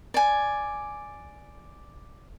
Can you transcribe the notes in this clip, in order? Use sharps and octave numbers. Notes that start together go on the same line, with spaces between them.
D5 G#5